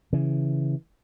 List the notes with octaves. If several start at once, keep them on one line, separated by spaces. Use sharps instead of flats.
C#3 E3